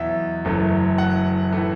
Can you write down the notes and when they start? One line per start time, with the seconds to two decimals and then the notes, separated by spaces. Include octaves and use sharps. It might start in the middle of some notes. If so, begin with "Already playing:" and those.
Already playing: E2 B2 F#3 E5
0.45 F#1 F#2 E3 A3
0.98 F#5
1.52 A2 E3 A3